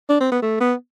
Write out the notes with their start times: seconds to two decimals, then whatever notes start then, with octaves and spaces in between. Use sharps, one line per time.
0.09 D4
0.20 C4
0.32 B3
0.42 A3
0.60 B3